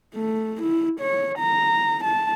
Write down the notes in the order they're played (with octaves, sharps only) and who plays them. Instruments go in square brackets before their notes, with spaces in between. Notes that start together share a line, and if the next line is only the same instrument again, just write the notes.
[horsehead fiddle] A3
E4
C#5
A#5
A5